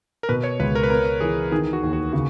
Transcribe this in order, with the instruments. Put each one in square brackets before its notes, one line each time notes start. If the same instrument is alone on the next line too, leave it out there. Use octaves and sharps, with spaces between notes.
[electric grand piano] A#4
[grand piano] B2 [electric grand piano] B4
[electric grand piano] C#5
[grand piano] C#2 [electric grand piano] B4
[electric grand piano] A#4
B4
[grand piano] B3 [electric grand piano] A#4
[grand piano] E3 [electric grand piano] G#4
[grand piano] D#3 [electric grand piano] G#4
[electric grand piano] F#4
[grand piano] D#2
[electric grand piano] F#4
[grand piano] C#3 [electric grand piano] F#4